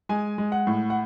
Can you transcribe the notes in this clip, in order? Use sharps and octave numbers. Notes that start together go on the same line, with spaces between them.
G#3 G#5
G#3
F#5
A2
F#5